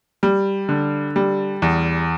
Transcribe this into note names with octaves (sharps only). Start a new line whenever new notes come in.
G3
D3
G3
E2